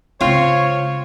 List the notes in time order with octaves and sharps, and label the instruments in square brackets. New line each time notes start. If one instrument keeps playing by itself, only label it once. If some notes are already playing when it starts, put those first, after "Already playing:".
[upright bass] C#3 G#3 [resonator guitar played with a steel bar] C4 F4 [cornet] C#5